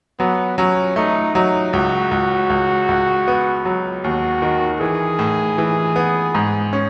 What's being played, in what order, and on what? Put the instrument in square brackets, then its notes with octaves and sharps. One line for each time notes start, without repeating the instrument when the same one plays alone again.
[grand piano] F#3 [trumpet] B3
[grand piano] F#3 [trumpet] C#4
[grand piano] A3 [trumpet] D#4
[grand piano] F#3 [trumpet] D#4
[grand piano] C#2 [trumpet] F#4
[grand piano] C#2
C#2
C#2
B3
F#3
[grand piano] D#2 [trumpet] F#4
[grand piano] D#3
[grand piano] E3 [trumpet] G#4
[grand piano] A2
E3
B3
G#2
C#4